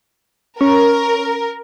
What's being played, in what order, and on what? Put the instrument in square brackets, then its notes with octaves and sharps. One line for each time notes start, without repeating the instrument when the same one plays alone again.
[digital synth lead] C#4 [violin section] A#4